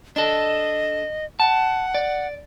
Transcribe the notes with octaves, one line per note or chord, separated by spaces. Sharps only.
D4 A4 D#5
F#5 A5
D5